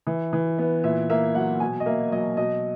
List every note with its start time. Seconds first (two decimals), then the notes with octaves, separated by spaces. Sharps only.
0.07 E3
0.33 E3
0.58 B3
0.84 A#2 E5
1.10 A#3 E5
1.35 F#3 F#5
1.60 B2 G#5
1.80 D#5
1.86 A#3 E5
2.12 F#3 D#5
2.37 B2 D#5